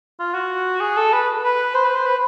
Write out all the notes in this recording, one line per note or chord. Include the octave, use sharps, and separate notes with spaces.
F4
F#4
G#4
A4
B4
B4
C5
B4
C5
B4